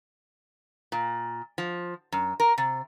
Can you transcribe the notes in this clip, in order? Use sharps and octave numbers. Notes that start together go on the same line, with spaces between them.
A#2
F3
F#2
A#4
C3